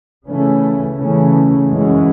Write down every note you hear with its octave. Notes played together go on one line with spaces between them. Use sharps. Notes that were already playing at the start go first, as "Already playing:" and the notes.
C#3 E3 A3 C#4
C#3 E3 A3 C#4
F#2 E3 G#3 C#4